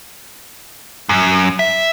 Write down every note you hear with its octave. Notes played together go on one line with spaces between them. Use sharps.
F#2
E5